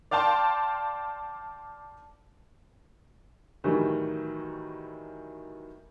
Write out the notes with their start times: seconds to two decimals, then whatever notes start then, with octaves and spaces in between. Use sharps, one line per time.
0.11 D5 F5 G5 A5 C6
3.64 A2 D#3 E3 F#3 G3